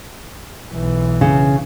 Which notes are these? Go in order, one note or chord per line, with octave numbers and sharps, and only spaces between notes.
B1 E3
C#3